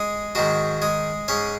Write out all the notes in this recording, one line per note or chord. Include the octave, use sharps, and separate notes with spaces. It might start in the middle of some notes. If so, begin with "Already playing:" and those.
Already playing: G#3 G#4
G#2 D#3 F#3 G#3 F#4
G#3 G#4
G#2 G#3 C#4 C#5